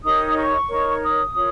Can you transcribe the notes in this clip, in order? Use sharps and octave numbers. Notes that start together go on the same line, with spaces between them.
D#4 G4 A#4 C#5 D#6
C#6
D#4 A#4 C#5
D#6
F4 A#4 C#5